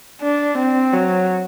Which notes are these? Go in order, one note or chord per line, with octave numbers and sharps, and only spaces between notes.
D4
C4
F#3